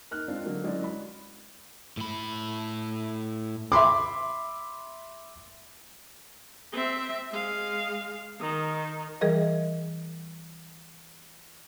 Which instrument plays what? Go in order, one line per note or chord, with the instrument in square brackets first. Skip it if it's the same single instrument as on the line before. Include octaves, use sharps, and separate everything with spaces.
[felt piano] A#3 D#4 F6 F#6
G#3 C4 D4 F4
D3 F#3 A#3
F#3 G#3 C#4 E4 D5
B5
[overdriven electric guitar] A2 B5
[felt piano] E5 B5 C6 D6
[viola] C4 E5
G#3 F5
D#3
[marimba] E3 G3 G#4 A#4 D#5